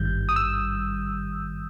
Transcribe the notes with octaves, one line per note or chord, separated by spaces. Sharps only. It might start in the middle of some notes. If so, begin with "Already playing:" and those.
Already playing: G#1 G2 D#3 G3 G6
D#6
E6